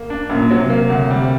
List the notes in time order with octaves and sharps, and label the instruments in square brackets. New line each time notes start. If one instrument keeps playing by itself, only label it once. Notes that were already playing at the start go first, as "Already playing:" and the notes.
Already playing: [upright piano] A#3
D4
[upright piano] F#2 [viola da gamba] A#2
[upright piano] F#3
[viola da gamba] C3
[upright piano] A#3
D2
G3